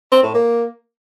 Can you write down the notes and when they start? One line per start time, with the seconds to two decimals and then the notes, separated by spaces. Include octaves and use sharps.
0.12 C4
0.23 A2
0.34 A#3